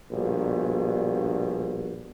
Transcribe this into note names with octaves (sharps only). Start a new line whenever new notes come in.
A#1 G2 B2